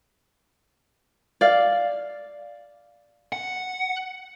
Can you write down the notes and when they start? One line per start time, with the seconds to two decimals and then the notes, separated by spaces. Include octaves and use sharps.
1.41 D5 F5
3.32 F#5